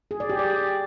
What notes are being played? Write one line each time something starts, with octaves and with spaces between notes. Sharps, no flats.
G#4
D5
G4
D5